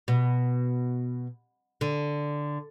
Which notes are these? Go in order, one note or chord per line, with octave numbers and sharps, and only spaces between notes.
B2
D3